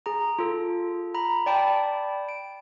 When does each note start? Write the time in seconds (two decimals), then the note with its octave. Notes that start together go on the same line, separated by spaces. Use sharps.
0.06 G#4 A#5
0.39 F4 A4
1.14 A#5 B5
1.46 D5 G5 A5 B5
2.29 D7